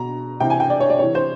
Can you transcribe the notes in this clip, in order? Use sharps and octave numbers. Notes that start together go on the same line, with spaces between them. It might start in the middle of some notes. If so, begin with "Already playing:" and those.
Already playing: B2 A#5
C3 E3 G5
G#5
G5
D5
C#5
D5
C3 E3 C#5
C5